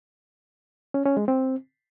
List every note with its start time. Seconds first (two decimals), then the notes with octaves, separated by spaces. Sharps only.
0.94 C#4
1.06 C#4
1.17 G#3
1.28 C4